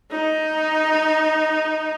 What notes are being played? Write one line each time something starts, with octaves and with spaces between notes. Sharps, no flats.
D#4